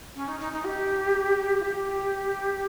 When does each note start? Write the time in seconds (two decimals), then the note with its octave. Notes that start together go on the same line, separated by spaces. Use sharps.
0.15 C#4
0.28 D#4
0.40 D#4
0.52 D#4
0.64 G4
1.59 F4
1.64 G4